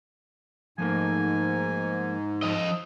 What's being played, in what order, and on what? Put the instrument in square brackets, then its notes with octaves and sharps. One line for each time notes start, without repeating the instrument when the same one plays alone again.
[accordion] G#2 [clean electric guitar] F3 A3 A#3 [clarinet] G#5
[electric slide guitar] F3 D#5